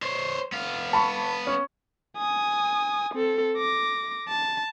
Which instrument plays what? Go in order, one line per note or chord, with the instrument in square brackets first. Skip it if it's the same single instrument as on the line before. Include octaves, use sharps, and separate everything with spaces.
[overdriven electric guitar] C5 C#5
B3 F5
[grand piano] A5 B5 C#6
C#4
[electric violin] G#5 D#6
C4 A4
D6 A#6
A5